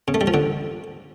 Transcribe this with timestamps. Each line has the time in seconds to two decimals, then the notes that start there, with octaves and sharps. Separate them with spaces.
0.08 C#3
0.14 A3
0.21 G3
0.27 F3
0.34 D3